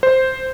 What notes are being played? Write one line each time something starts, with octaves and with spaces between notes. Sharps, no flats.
C5